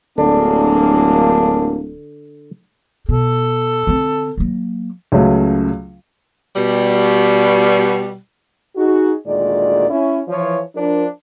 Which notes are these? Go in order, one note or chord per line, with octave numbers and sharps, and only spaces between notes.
D1 D3 F#3 G#3 A#3 D4
B2 A4
D3 C4
F#3 A#3
C#2 C#3 F#3 A3
B2 G3
D#4 F#4 G#4
D2 A#2 D#3 G#3 D5
C#4 E4
E3 F3 C#5
F3 D4 A#4